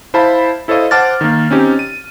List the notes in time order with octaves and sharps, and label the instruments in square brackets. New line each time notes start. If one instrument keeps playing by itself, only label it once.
[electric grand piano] E4 C5 F5 A5 B5
E4 A4 C5 C#5 D#5 F5
C5 F#5 A5 D6 F6 A6
D#3 A#3
C4 C#4 D#4 G4
D#7